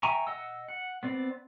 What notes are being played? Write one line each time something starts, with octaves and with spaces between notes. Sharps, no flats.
E5 G5 G#5 A#5 C#6
D#5 F#5 E6
F#5
B3 C4 D5